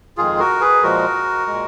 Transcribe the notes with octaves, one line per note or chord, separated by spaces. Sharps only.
F2 D#3 G#3 F4 G#4
F#4 A#4
G#4 B4
A#2 F3 G#3 F#4 A#4
A#2 G#3